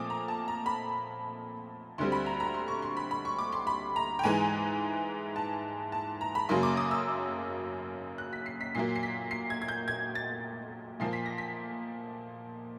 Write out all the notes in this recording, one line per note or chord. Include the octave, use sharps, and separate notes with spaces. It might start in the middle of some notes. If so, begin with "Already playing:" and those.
Already playing: A#2 F3 A3 C4 D6 D#6
A#5
A5
A#5
B5
D2 D3 G3 C4 C6
B5
A#5
A#5
C6
C#6
C6
B5
B5
C#6
D6
C6
B5
A#5
G5
G#2 E3 G#3 G#5
A5
A5
A#5
B5
F#2 C#3 F#3 A#3 C6
D6
D#6
E6
F#6
B6
C7
B6
A#2 F#3 A#3 C7
C7
B6
C7
G#6
G#6
G6
G#6
A6
A#2 F3 A#3 C7
B6
A#6
B6